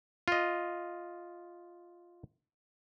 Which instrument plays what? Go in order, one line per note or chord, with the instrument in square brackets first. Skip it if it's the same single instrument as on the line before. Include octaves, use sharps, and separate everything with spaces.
[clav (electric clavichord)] F4 D#5